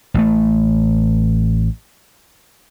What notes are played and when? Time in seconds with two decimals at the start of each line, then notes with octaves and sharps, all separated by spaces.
0.14 A1 A3